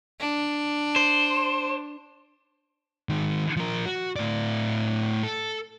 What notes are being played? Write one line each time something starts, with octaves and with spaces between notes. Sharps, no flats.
D4
C5
D#3 G#3
F3 A#4
F#4
A2 D5
A4